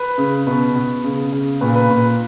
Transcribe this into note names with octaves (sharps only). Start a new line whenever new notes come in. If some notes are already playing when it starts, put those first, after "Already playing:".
Already playing: B4
C#3
B2 B4
B2
C#3
C#3
A#2 B4
B4
A#2